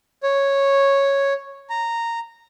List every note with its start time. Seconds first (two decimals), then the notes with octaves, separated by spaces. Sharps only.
0.23 C#5
1.70 A#5